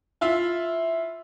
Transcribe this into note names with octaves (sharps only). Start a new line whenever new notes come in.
E4 F4 E5